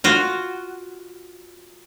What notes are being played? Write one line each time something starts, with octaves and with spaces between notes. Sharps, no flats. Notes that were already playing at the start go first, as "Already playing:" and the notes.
F4 F#4